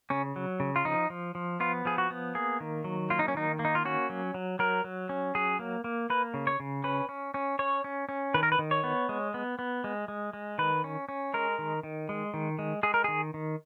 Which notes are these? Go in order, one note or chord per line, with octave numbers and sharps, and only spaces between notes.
C#3 C#4
F#3
C#3
F4
F3 D#4
F3
F3
B3 F4
F3 G#4
F#4
B3
A#3 G#4
D#3
F#3
A#3 F4
D#4
C#4
D#3 D#4
A#3
D#4
F4
C#4 F#4
F#3
F#3
F#3 A#4
F#3
C#4
F#3 G#4
A#3
A#3
A#3 B4
C#3
C#5
C#3
C#4 B4
C#4
C#4
C#4 C#5
C#4
C#4
D#3 B4
A#4
B4
D#3
C#5
B3
G#3
B3
B3
G#3
G#3
G#3
D#3 B4
C#4
C#4
G#3 A#4
D#3
D#3
G#3
D#3
G#3
G#3 G#4
A#4
D#3 G#4
D#3